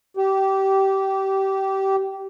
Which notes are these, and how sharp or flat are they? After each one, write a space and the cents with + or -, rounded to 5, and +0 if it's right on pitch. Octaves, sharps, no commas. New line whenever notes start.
G4 -20